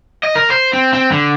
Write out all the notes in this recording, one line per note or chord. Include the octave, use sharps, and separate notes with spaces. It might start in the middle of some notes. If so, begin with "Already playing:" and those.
D#5
A#4
C5
C4
C4
D3